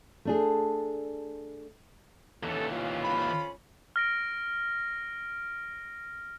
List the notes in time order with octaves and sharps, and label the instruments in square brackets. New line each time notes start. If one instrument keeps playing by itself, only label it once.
[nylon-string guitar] A3 D4 G#4
[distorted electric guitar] D#2 E3 [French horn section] C#4 A4
[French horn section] F2 C#4 F4
[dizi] B5
[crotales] F6 A#6 D7